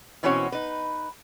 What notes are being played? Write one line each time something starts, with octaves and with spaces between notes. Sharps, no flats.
B2 E3 C4 C#4 F#4 C#5
D#4 B4